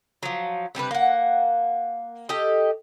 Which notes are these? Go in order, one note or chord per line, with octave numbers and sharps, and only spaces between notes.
F3 F#3
C3 G3 D4 B4
A#3 F#5
G4 A4 D#5